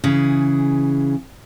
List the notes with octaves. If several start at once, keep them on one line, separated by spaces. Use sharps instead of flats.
C#3 E3 G#4